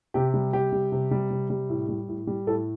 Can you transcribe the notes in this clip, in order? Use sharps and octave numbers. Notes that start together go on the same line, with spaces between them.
C3 G4
G3
C3 G4
G3
C3
G3
C3
G3
A2
G3
A2
G3
A2 A4